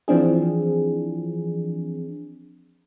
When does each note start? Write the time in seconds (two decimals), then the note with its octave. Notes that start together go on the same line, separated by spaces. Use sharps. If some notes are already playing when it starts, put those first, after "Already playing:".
0.08 E3 F3 C4 D4 G#4